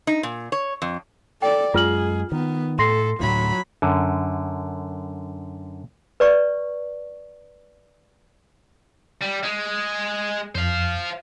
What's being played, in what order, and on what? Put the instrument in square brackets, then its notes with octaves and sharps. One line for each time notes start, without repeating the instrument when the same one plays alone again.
[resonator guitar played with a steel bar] D#4
A#2
C#5
F2
[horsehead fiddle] A4 D5 [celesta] G5
[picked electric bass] F#2 G#3 [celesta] F4 F6 F#7 [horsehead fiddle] G#4
[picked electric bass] D#3 [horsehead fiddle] B3
[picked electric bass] A2 [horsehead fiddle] A4 [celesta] C6 A#6 C7
[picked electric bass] D2 A2 [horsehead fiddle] F#3 B5
[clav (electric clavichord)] F#2 D3
[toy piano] B4 D5 C#6
[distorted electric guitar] G3
G#3
[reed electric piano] F2 [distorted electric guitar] C5 F5